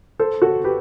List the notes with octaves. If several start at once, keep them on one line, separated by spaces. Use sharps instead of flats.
A4 C5
F#4 A4
G4 B4